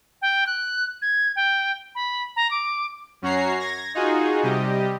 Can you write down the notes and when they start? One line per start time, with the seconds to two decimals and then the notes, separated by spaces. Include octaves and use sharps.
0.22 G5
0.47 F#6
1.02 G#6
1.36 G5
1.95 B5
2.36 A#5
2.51 D6
3.22 F#2 C#4 F#4 C#5 A#5 C7
3.59 G#6 A#6
3.95 D#4 F4 F#4 G#4
4.43 C3 G3 G4 D#5